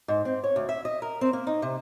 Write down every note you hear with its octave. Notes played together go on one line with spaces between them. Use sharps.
G#2
C4
C#5
D2
E5
D#5
A#4
C4
A#3
D#4
C3